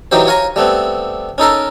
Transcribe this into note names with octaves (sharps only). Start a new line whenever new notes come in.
E3 F#3 D#4 G4 C5
C#5 F5 G#5 A#5
G3 A3 B3 C4
C#4 D#4 A4 A#4